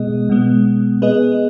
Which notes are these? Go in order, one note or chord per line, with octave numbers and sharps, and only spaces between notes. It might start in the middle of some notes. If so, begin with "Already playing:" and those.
Already playing: B2 G#3 B3 G#4 D#5
B2 G#3 B3
B3 G#4 B4 D#5